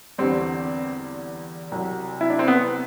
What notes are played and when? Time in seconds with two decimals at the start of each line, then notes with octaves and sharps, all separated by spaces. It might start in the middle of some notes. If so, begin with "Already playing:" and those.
0.18 E2 D3 G3 C4
1.72 C2 C3 F#3
2.21 E4
2.30 D4
2.39 C4
2.48 B3